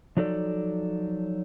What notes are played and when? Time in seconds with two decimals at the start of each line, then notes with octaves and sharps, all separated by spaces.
0.17 F3 F#3 D#4 A4 D5